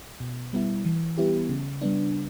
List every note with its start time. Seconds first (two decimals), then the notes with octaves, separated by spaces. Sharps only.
0.20 B2
0.53 G3 B3 E4
0.85 E3
1.18 G3 B3 E4 G4
1.49 C#3
1.81 G3 B3 D4